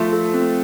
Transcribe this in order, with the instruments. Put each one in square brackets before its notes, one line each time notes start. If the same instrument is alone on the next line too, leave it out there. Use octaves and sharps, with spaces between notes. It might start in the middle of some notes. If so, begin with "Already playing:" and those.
Already playing: [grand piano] F3 A3 [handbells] F4
[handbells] A4
C4